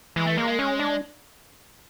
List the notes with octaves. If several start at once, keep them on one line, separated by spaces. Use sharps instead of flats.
E3 G#3
A3
G#3 A#3
G#3
C#4
D4